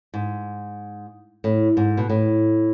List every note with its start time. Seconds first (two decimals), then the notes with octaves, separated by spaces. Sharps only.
0.14 G#2
1.44 A2
1.77 G#2
1.97 B2
2.10 A2